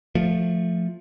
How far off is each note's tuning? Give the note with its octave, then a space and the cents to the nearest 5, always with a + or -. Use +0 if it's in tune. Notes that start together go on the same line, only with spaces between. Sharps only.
F3 +0 A3 +0